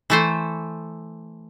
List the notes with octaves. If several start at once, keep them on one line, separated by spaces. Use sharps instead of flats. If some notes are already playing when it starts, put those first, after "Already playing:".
E3 A3 C5